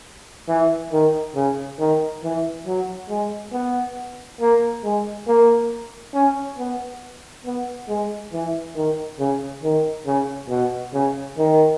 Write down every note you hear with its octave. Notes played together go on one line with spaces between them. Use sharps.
E3
D#3
C#3
D#3
E3
F#3
G#3
B3
A#3
G#3
A#3
C#4
B3
B3
G#3
E3
D#3
C#3
D#3
C#3
B2
C#3
D#3